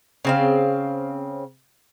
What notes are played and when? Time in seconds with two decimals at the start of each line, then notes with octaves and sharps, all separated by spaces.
0.25 C#3 C4 F5